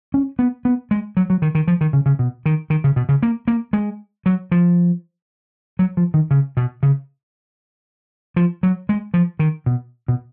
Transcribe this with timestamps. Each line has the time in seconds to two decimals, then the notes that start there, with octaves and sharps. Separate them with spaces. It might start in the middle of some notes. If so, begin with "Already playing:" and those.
0.14 C#4
0.39 B3
0.65 B3
0.91 G#3
1.17 F#3
1.30 F#3
1.42 D#3
1.55 D#3
1.68 F3
1.81 D#3
1.93 C#3
2.06 C#3
2.19 B2
2.46 D#3
2.70 D#3
2.84 C#3
2.96 B2
3.09 C#3
3.23 A#3
3.48 A#3
3.73 G#3
4.26 F#3
4.52 F3
5.79 F#3
5.97 F3
6.14 D#3
6.31 C#3
6.57 B2
6.83 C#3
8.36 F3
8.63 F#3
8.89 G#3
9.14 F3
9.39 D#3
9.66 B2
10.08 B2